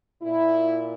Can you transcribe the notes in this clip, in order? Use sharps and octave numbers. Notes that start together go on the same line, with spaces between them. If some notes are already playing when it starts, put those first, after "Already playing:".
A#2 E4